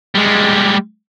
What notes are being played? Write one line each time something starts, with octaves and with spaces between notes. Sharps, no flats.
G3 G#3